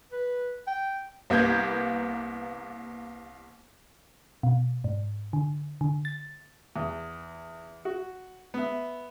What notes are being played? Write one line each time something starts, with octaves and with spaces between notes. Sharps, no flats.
B4
G5
C2 A#3 B3 G6 G#6
B2
G#2
D3
D3
A6
E2
F#4
B3 E5